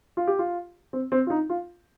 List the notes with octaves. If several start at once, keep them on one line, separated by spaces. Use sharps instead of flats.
F4
G4
F4
C4
C4
F4
D#4
F4